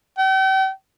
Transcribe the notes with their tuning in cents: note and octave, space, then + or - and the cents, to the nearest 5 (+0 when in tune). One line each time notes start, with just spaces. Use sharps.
G5 -40